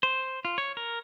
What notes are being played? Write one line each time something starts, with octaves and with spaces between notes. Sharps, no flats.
C5
F4
C#5
A#4